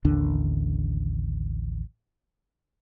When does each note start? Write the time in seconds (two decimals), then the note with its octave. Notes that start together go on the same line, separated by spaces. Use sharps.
0.05 A1 D#2 D3 D4